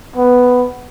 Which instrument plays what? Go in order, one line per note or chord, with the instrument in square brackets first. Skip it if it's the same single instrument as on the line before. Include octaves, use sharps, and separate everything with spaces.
[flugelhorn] B3